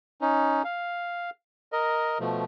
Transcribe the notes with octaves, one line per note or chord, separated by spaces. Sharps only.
C#4 D#4
F5
A#4 D#5
B2 F3 A3